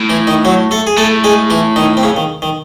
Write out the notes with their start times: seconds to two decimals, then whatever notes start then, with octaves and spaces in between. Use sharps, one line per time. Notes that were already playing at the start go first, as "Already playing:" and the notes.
Already playing: A2
0.10 E3 E4
0.27 D#3 D#4
0.45 F#3 F#4
0.71 A3 A4
0.87 G#4
0.97 A2 A3 A4
1.24 G#3 G#4
1.50 E3 E4
1.76 D#3 D#4
1.97 C4
2.03 C#3 C#4
2.17 D#3
2.42 D#3